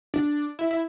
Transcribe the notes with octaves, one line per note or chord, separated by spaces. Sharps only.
D4
E4
E4